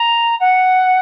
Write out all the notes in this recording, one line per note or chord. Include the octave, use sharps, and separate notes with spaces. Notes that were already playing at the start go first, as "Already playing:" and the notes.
Already playing: A#5
F#5